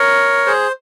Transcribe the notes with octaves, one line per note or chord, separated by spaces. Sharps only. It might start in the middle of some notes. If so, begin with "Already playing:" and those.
Already playing: A#4 C#5
G#4 C5